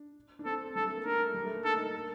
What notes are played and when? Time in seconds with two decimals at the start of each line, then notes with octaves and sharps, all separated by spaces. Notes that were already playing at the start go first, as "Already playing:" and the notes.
Already playing: D4
0.39 D4
0.46 C4 A4
0.75 G3 A4
0.86 A3
0.95 A#3
1.05 D4 A#4
1.15 A#3
1.25 A3
1.34 G3
1.45 A3
1.55 A#3
1.65 D4 A4
1.75 D#4
1.94 A#4